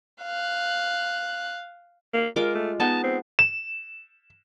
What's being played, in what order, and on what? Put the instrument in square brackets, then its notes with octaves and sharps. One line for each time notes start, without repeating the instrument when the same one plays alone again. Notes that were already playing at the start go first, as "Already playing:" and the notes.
[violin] F5 F#6
[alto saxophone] A#3
[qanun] G#3 F4 D6 [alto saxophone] A#4
[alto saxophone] A3
[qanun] G#3 B3 D#4 [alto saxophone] A5
[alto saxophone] C4
[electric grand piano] E7